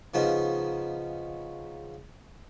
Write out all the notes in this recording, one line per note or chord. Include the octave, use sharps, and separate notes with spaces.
C#3 F3 B3 D#4